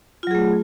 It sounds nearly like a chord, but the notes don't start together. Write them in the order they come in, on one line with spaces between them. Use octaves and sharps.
F4 F#3 G#4 A3